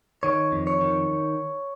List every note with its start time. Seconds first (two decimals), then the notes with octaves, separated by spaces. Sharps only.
0.23 D#3 C#5
0.52 F2
0.67 C#5
0.81 D#3